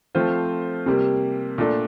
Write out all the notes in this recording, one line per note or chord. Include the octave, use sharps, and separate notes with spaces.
F3 A3 C4 F4 C5
C3 G3 A#3
A#2 A3 D4 A4